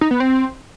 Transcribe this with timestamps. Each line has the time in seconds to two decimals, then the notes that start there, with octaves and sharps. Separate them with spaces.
0.01 D#4
0.11 B3
0.20 C4